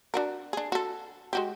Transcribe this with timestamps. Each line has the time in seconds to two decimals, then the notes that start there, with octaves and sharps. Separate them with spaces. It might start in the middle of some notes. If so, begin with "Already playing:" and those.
0.14 D4 F#4 A#4
0.53 D4 G#4
0.72 F#4 A4
1.33 G#3 F#4 G4